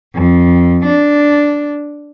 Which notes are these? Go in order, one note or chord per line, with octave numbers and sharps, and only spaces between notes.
F2
D4